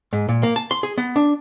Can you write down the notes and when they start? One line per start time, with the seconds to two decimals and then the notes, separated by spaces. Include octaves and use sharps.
0.13 G#2
0.29 A#2
0.43 A#3
0.56 A5
0.71 C6
0.83 G#4
0.98 B3
1.16 D4